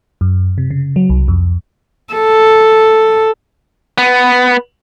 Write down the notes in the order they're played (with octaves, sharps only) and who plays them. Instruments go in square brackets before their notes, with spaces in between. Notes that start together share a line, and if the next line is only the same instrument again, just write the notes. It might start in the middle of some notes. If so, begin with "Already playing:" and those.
[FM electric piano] F#2
C3
C#3
F#3
C2
F2
[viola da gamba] A4
[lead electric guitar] B3